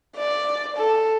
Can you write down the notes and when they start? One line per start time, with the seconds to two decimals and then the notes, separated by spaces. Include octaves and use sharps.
0.17 D5
0.77 A4